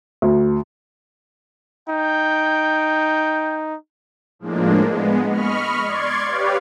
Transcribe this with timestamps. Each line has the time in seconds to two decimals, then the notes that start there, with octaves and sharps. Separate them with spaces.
0.22 D2
1.89 D#4 G5
4.39 A2 F3 G#3 A#3 D4
4.89 G#3 B3
5.27 D#5 B5 C#6 F6
5.84 D5 C6 C#6 G#6
6.24 G4 B4 C#5 D5 F5